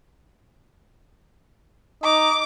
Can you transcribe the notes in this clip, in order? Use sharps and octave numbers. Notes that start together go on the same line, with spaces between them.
D#4 D6